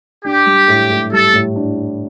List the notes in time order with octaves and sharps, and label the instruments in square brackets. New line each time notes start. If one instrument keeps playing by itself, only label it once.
[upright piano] D4 [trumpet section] G4
[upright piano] G3
A2
A2
[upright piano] G3 [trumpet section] A4
[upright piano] A2
D4